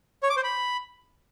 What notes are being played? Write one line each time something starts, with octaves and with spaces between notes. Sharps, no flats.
C#5
D6
C5
B5